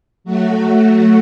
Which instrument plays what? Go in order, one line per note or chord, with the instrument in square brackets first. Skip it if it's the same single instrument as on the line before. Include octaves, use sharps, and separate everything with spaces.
[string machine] F#3 A3 F#4